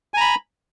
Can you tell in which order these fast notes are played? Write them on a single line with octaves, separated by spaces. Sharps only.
G#5 A#5 B5